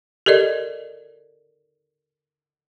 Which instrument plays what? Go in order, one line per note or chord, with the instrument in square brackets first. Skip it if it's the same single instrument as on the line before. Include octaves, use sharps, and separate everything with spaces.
[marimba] G4 A4 A#4 D5 D#5